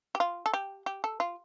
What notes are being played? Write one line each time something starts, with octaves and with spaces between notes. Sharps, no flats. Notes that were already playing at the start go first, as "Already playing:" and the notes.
G4
F4
A4
G4
G4
A4
F4